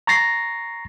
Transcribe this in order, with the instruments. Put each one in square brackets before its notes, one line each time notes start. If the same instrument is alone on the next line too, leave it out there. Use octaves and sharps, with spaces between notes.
[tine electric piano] A#5 C#6 A6 A#6 C7